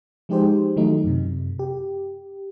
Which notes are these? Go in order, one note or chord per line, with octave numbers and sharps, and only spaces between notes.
F3 G#3 D#4 G4 G#4 C5
D#3 F#3 A3 D#4
F#2 C3
G4